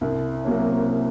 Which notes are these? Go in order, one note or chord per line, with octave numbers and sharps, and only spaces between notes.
C2
C3 F#3 A#3 C#4